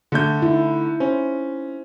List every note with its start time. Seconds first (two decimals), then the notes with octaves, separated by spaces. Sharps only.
0.12 D3 A3 G6
0.42 D#4 E4
1.00 C#4 C5